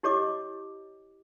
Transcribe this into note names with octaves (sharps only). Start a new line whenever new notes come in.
E4 G4 C#5 D#5 D6